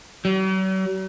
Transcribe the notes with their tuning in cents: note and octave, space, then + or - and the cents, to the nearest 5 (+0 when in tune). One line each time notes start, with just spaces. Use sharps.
F#3 +45